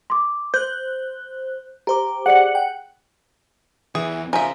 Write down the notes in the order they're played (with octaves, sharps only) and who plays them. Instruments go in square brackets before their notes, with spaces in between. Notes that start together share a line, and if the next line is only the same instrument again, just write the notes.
[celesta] C6 D6
[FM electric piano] C5 F#6 [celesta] G6
[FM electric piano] G4 C5 D6 [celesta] A#5
[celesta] G#4 D5 C#7 [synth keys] F#5
[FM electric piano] G5
[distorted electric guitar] E2 [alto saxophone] E3 [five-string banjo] G#4
[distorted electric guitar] C#3 C#4 [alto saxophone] F3 [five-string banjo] A#4 E5 [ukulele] G#5